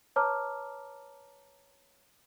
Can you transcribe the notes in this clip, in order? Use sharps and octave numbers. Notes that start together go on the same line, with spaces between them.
B4 C#5 A5 A#5 D6 F6